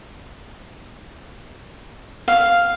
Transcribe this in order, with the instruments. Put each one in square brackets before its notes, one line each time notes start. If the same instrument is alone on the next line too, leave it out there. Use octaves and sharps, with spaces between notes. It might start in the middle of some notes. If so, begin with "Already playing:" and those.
[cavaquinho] F5